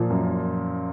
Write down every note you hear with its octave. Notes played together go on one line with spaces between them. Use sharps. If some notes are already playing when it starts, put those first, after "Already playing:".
Already playing: A#2 F3
F#2